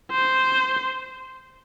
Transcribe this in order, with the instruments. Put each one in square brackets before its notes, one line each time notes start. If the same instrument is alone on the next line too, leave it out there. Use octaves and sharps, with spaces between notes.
[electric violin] C5